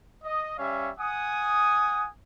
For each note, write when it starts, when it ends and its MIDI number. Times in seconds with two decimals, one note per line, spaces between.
0.24 0.57 75
0.58 0.90 55
0.58 0.90 61
0.58 0.90 73
0.58 0.90 76
0.58 0.90 77
0.99 2.07 78
0.99 2.07 80
0.99 2.07 87